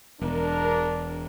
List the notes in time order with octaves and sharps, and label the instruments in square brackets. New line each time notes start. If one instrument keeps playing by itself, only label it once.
[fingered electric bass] E1 [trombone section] D4 A#4